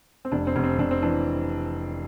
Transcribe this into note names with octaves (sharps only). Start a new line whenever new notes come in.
C4
F1 D4
C4
F1
C4
F1 D4
C4
E3 D4